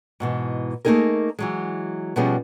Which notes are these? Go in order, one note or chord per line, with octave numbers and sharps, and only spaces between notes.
G#2 B2 E3
A3 A#3 C4 D#4 G#4 A#4
E3 F#3 G#3
B2 F3 G3 B3 C#4 G#4